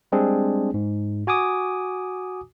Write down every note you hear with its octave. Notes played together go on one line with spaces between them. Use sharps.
G3 G#3 C4 D4 G#4
G#2
F#4 G#5 D6 D#6